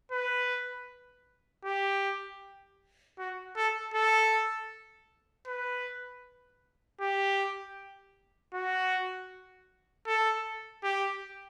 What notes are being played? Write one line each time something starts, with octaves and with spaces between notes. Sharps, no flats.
B4
G4
F#4
A4
A4
B4
G4
F#4
A4
G4